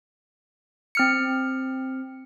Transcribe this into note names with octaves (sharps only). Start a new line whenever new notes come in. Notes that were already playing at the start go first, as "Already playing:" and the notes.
C4 F6 C#7